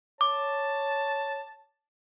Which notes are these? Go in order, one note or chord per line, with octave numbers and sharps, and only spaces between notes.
C#5 A5 D6